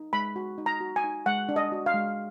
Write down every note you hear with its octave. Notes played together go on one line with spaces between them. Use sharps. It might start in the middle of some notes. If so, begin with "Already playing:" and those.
Already playing: D#4
G#3 B5
F#4
D#4
A#5
F#4
G#5
D#4
G#3 F#5
D4
D#5
F#4
F5
G#3